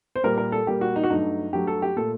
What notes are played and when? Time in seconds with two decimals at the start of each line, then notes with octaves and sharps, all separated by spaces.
0.16 C5
0.24 A#2 G3 A#3 A#4
0.38 A#4
0.52 A4
0.67 A#2 G3 A#3 G4
0.81 F#4
0.96 D#4
1.03 F#4
1.10 G2 F#3 A3 D#4
1.53 G2 F#3 A3 G4
1.67 A4
1.82 G4
1.96 A#2 A3 A4